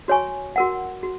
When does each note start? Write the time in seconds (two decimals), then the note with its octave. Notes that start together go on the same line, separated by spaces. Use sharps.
0.08 F#4 C#5 G#5 C#6
0.56 F#4 A#4 F#5
1.03 F#4